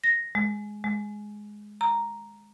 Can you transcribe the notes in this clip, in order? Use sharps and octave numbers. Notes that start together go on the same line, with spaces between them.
A#6
G#3
G#3
A#5